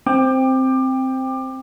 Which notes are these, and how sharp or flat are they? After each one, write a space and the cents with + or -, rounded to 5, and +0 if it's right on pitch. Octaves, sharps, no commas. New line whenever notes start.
C4 +0 G5 +15 D6 +25